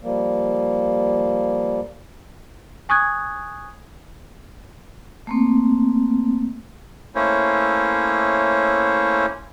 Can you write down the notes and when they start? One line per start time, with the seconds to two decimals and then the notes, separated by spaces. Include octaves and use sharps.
0.03 F3 G3 A#3
2.89 G#5 C#6 D#6 F#6 G#6
5.27 A3 A#3 C4
7.15 A3 A#3 C#4 E4 C5 C#5